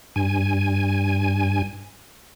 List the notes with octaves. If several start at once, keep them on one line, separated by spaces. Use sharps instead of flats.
G2 G#5